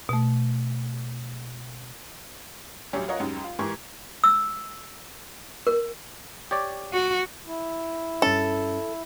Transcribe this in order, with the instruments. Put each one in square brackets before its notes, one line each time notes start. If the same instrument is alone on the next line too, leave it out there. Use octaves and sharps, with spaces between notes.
[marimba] B2 A3
[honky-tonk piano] A1 D2 F#3 G3 G4 C#5
F4 A#4 C#5 D#5 F#5
C#2 F#2 G3 G#3 D#4
F4
G#2 E3 G4 A#4 C#6 G#6
[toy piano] E6
A#4
[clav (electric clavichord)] G4 C#5 D5
[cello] F#4
[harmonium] E4
[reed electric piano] G2 C#4 [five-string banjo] A4